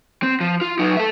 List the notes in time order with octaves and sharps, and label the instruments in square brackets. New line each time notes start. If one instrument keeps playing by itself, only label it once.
[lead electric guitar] C4
F3
F4
F#3 D#4
A4 E5